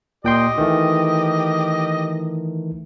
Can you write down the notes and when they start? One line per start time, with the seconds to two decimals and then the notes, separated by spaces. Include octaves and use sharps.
0.25 A#2 G4 D#5 G5 C6
0.58 D#3 E3 A3